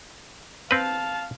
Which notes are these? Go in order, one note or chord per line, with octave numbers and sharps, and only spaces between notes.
C4 B4 F5 A5